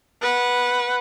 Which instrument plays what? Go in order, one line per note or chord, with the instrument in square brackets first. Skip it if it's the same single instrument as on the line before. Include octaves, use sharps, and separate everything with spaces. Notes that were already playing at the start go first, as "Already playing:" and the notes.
[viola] B4 F#5